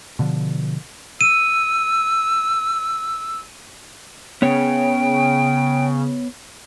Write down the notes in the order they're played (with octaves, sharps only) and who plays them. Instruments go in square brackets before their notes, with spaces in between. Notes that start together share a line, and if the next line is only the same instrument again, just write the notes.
[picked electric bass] B2 D3 F3
[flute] E6 [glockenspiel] D#7
[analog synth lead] C#3 [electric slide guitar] B3 C#5 [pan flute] G5